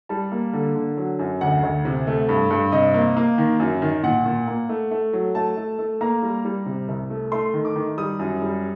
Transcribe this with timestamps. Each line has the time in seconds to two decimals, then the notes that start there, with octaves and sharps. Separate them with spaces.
0.09 G3 A5
0.32 A#3
0.53 D3
0.75 D3
0.97 F#3
1.19 F#2
1.41 D2 F#5
1.63 D2
1.85 C3
2.07 A3
2.29 G2
2.50 G2
2.72 C3 D#5
2.94 A#3
3.17 A#3
3.38 D#3
3.60 F#2
3.82 D#3
4.03 A#2 F#5
4.26 A#2
4.48 A#3
4.69 A3
4.91 A3
5.13 F#3
5.35 A3 A5
5.57 A3
5.79 A3
6.01 A#3 A#5
6.22 G3
6.45 G3
6.66 C3
6.88 C2
7.10 A3
7.32 A3 C6
7.54 D#3
7.65 D6
7.76 D#3
7.98 G3 D#6
8.19 F#2
8.42 G3